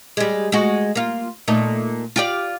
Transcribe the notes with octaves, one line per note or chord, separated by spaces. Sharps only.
G3 G#3
G#3 F#4
A#3 F4
A#2 A3 D#4
F4 G4 D5